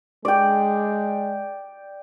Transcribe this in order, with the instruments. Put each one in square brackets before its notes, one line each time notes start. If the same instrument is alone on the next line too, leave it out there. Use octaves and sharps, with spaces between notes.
[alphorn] G#3 [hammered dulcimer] D5 G5